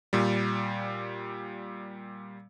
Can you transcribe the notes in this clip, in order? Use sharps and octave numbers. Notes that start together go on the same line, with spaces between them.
A#2 G3